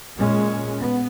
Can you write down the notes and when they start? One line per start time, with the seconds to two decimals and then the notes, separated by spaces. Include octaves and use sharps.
0.18 A#2 G#3 C#4
0.78 B3